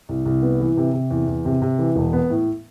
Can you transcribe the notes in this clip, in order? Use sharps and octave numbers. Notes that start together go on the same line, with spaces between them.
C2
C2
B3
E3
C3
C3
E2
E2
C3
C3
E3
E1
B3
A2